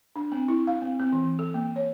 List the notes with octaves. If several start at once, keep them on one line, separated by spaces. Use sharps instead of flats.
D4
C4
E4
F5
C4
C4
E3
A4
A#3
C#5